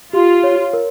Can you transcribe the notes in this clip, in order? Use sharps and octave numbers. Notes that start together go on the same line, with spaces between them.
F4 G4
C#5
A#4